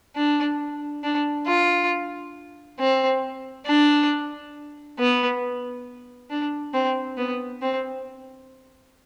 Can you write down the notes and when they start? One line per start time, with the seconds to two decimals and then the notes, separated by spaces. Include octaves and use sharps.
0.16 D4
1.04 D4
1.47 F4
2.79 C4
3.66 D4
4.99 B3
6.30 D4
6.74 C4
7.17 B3
7.62 C4